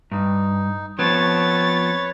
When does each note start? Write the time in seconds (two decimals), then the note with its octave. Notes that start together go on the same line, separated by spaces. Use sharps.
0.12 G2 D#4
0.99 F3 B3 C4 B4 C#5 C#6 A6